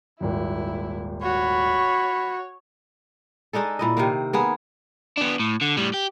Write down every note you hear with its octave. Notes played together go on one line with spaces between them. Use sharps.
D#1 G#1 D#2 E4
F#4 C#5 B5
G#3 D4 D#4 A4
A#2 E4 D#5
C3 D#3 A#3
A#3 B3 G#4
B3 D4
A2
D3
A2 G3
G4